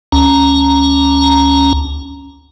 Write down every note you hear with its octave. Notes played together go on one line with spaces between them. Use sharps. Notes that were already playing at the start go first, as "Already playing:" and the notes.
D2 C#4 A#5